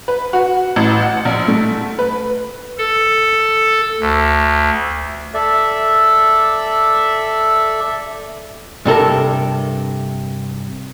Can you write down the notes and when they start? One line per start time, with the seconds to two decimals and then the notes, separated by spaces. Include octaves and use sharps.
0.08 B4
0.33 F#4
0.76 A1
1.02 F#5
1.25 A#1
1.48 A3
1.99 B4
2.78 A4
4.00 D2
5.34 A4 D5 E5
8.85 G2 C3 A4 A#4